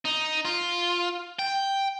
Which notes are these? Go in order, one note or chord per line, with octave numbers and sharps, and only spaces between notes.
D#4
F4
G5